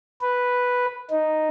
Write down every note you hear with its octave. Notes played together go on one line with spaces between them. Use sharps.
B4
D#4